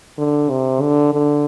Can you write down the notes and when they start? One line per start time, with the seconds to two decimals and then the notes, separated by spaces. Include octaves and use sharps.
0.18 D3
0.50 C3
0.82 D3
1.13 D3